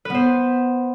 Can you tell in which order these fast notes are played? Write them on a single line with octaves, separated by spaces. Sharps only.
B4 B3 C5